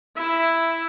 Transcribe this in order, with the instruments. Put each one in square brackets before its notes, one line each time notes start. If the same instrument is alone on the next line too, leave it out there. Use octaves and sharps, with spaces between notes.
[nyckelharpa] E4 [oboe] E5